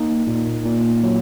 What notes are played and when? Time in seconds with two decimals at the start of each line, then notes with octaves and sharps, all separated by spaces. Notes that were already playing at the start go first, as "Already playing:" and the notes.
Already playing: A#3 D#4
0.27 A#2
0.65 A#2
1.03 F#3